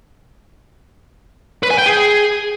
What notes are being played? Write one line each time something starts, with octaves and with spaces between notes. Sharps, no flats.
B4
G#5
G5
G#4